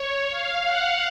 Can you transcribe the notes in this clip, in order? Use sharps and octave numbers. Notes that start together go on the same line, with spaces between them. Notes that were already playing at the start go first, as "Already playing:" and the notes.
Already playing: C#5
F5
F#5